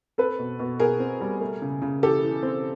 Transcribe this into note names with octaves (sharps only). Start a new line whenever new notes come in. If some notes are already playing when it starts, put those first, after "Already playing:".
C4 A4 B4
B2
B2
B2 G#4 A#4
C4
G3
A3
C#3
C#3
E3 G4 A4
E3
C4